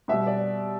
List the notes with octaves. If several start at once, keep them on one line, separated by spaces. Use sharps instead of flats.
B2 G3 E5
D5